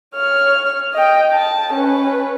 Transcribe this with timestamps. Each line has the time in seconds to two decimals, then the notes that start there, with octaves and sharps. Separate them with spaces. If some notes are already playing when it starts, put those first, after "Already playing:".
0.15 C#5 F6
0.94 D#5 G5
1.33 A5
1.74 C#4 B4